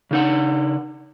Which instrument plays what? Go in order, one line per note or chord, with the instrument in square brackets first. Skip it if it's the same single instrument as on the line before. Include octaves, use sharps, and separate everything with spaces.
[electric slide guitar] C#3 D#4 F#5